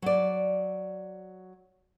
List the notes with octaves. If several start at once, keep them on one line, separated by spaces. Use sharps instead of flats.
F#3 D5